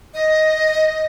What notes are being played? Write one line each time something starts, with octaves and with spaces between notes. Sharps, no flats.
D#5